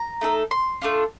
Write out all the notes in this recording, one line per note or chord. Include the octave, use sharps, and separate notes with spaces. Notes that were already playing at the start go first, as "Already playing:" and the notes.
Already playing: A#5
A3 D#4 A4
C6
A3 D4 F4